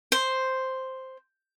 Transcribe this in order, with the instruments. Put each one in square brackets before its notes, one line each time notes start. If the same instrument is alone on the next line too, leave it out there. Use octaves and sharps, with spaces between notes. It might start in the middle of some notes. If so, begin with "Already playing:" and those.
[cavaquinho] C5